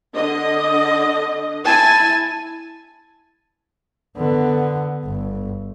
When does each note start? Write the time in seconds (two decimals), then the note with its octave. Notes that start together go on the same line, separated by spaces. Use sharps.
0.16 D3 D#5
1.65 E4 G#5 A5
4.18 D3 B3
5.06 G1